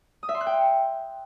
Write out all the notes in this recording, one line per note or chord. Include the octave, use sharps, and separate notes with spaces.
D#6
E5
C6
F#6
G5